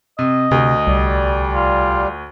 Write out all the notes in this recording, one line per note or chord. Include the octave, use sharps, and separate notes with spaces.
C3 D#5
D2 C3
C2 G3 D5
F4